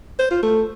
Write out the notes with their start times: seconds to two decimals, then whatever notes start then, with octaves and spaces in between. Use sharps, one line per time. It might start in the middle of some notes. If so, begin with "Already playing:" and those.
0.19 C5
0.31 F4
0.43 A3